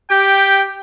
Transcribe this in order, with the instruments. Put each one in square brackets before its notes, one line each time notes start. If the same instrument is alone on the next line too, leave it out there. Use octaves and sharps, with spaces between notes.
[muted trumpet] G4 [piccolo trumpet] G5